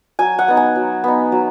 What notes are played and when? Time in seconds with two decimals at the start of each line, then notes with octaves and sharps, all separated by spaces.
0.19 F#3 G#5
0.39 F#5
0.48 B3 D#4
0.57 G#5
0.76 F#3
1.04 B3 D#4
1.32 F#3